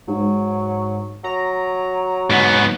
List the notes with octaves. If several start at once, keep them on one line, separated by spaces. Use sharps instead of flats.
G#2 F#3
F#3 A#5
G#2 B3